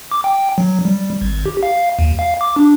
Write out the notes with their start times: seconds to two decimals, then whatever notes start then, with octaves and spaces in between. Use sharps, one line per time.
0.11 D6
0.24 G5
0.58 F#3
0.85 G3
1.21 G#1
1.46 G4
1.63 F5
1.99 D#2
2.19 F5
2.41 D6
2.56 D4